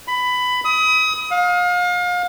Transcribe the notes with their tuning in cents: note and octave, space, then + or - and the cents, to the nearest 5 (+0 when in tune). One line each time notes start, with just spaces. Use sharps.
B5 +15
D#6 +30
F5 +35